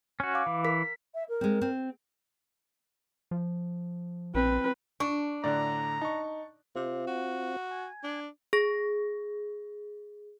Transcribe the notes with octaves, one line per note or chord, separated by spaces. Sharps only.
C#4 F#4
F5 D6
E3
A#4 B6
E5
A#4
G#3 C4
C4
F3
A#1 C4 B4
D4 C#6
A2 D3 D5 A#5 F#6
D#4 A5 C#6
C3 C4 F4
F#4
G#5
D4
G#4 A#6